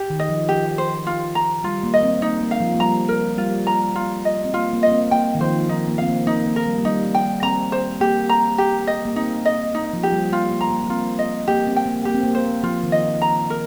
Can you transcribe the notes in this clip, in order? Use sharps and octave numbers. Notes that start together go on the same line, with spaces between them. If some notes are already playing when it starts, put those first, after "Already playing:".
Already playing: G4
D#3
D#5
F3
G4
C5
F4
A#5
G3 F4
A#3
D#5
C4
A#3 D#4
A#3
F5
F3
A#3
G3 A#5
A#4
G3 F4
A#5
F4
D#5
C4
A#3 F4
A#3
D#5
A#3
C4
A#3 G5
D#3
F3 C5
F3 D#4
A#3
C4 F5
A#3
A#3 D#4
A#3
A#4
G3
A#3
G3 D#4
G5
C4 A#5
C5
A#3 G4
A#5
G4
D#5
A#3
C4 D#4
D#5
D#4
F3
G4
G3
A#3 F4
A#3
A#5
A#3
A#3
C4 F4
D#5
A#3 G4
C4
G5
A#3
A#3 G4
C4
A#3
C5
F3 F4
D#3
D#5
F3
A#5
A#4